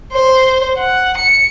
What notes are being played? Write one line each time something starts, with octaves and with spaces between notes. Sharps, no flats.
C5
F#5
C#7